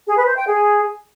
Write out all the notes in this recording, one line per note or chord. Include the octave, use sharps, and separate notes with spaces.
G#4
B4
C5
G5
G#4